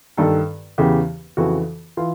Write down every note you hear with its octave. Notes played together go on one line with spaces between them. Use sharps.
G2 D#3 A4
E2 C#3 E3 G4
F2 C#3 E3 F#4
E3 F4